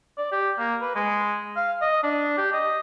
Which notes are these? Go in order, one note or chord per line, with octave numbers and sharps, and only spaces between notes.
D5
G4
A#3
B4
G#3
F5
D#5
D4
G4
D#5